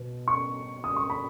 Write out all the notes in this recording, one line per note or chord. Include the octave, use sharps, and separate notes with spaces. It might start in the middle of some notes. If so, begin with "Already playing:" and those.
Already playing: B2 B3
C#6
D#6
C#6
B5